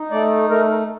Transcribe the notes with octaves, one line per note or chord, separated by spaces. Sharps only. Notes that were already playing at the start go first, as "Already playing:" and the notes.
Already playing: D#4
A3 D5
A3 A#4